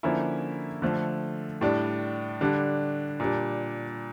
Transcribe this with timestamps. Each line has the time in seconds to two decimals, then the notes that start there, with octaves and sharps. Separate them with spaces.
0.03 D3 F3 A#3 C#4 E4
0.82 D3 F3 A3
1.61 A2 G3 D4
2.41 D3 G3 D4
3.20 A#2 G3 D4